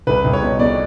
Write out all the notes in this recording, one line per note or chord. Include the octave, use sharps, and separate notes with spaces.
C2 B4
C2
C#5
B2
B2 D5